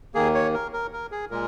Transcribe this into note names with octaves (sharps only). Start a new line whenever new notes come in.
D#2 D#3 A#3 G#4
C#5
A#4
A#4
A#4
G#4
A#2 G#3 A#4